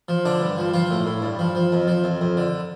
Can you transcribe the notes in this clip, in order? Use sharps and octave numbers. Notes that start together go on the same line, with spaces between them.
F3
D3 D4
G2
F3
F3 F4
A2
A2
G2
F3
F3
F2
F3
F2
F2
D3